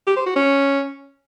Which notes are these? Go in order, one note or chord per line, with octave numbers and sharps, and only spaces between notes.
G4
C5
F#4
C#4